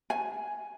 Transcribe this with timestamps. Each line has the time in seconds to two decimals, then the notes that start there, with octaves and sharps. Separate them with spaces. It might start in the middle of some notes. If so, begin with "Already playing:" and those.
0.10 G#5